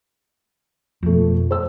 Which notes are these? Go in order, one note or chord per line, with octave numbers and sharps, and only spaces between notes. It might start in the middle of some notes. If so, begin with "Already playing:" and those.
F2 B2 F3 A3
C5 E6